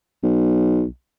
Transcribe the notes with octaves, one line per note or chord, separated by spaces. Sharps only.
B1